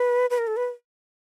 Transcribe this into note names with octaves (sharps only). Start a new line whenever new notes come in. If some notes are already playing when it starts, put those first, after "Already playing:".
Already playing: B4
B4
A#4
A4
B4